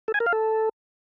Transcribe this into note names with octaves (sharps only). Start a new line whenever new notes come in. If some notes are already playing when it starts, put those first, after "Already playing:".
A4
G#5
A#4
F5
A4